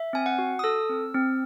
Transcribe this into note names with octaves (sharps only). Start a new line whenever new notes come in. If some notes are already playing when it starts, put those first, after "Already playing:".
Already playing: E5
C4 G#5
F#5
F#4
D#6
A4 E6
C4
C4